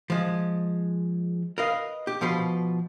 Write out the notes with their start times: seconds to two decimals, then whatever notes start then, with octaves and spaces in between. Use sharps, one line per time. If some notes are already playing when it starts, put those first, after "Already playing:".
0.10 F3 G#3
1.58 A#4 B4 D#5 F5
2.07 G4
2.21 B2 F3 B4 C6